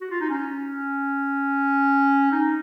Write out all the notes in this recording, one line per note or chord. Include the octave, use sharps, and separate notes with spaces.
F#4
F4
D#4
C#4
D#4